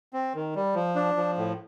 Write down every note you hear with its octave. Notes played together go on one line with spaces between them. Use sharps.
C4
D#3
G3
F3
D4
F3
A2